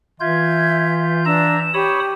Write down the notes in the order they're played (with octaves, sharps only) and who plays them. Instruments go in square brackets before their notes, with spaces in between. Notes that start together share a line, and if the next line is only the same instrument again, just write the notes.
[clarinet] E3 [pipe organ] F4 G6 [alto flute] E5 [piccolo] G#6
[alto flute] D4 [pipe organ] E5 A#5 [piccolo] E7
[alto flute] G4 [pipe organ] C#5 B5 D#6